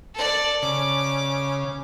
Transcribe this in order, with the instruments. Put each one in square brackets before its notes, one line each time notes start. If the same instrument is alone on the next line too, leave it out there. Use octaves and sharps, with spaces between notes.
[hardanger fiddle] A4 D5
[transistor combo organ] C#3 [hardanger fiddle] D6